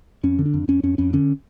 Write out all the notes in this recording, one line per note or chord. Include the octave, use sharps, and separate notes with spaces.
F2 C#4
D3
D4
F2
F2 C#4
F2 C#4
F2 C#4
D3 C#4